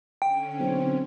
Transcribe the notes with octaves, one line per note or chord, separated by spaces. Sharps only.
D3 C#4 G5
B1 C4